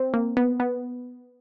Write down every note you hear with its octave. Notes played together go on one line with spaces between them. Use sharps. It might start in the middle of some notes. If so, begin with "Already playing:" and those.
Already playing: C4
A#3
B3
B3